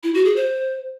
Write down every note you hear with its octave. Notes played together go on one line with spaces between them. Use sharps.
E4
F#4
G#4
C5